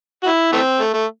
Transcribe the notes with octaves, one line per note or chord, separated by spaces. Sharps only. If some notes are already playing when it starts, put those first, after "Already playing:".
F#4
E4
E3 A3 C4
A3
A3